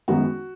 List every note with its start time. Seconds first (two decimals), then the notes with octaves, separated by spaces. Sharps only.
0.08 F#2 D#3 G#3 B3 F#4